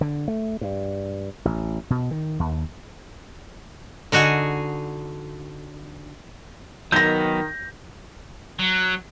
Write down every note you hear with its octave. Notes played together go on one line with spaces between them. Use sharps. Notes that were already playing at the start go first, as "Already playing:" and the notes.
D3
A3
G2
A1
B2
D#3
D#2
D3 D#4 F#4 G#4
D#3 F#3 B3 G6 A#6
F#3